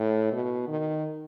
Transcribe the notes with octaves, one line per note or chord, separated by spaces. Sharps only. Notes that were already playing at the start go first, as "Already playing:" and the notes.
Already playing: A2
B2
D#3